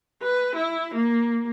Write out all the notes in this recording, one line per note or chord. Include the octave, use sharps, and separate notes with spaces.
B4
E4
A#3